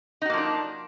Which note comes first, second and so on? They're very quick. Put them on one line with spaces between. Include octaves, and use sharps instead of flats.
D#4 F#4 A#3 F3 D4